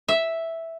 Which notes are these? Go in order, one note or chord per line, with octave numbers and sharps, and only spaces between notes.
E5